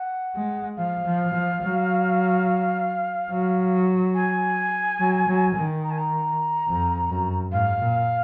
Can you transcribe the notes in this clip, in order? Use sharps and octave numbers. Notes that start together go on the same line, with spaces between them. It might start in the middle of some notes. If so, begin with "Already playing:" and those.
Already playing: F#5
G#3
F3 F5
F3
F3
F#3
F#3
G#5
F#3
F#3
D#3
A#5
G#5
A#5
F2
F#2
G#2 F5
A#2